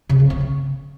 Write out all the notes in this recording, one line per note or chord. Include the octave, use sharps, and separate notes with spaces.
C#3
C4
C#4
C#3